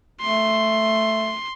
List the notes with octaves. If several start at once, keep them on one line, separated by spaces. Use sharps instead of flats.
A3 C6